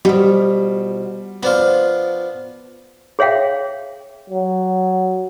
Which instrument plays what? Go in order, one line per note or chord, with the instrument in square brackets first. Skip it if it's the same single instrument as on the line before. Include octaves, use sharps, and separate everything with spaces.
[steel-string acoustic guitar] B2 F3 [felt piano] G3
[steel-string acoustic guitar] F3 [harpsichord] B3 D4 F4
[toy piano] G#4 C#5 E5 F5 G5
[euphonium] F#3